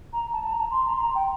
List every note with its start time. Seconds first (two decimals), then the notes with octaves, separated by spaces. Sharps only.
0.12 A#5
0.32 A5
0.43 A5
0.51 A#5
0.70 C6
0.85 A#5
0.93 C6
1.00 A#5
1.15 G5